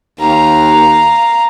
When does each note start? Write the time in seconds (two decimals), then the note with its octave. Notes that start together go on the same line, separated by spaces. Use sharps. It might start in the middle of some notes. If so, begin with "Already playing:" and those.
0.19 D#2 F5 A#5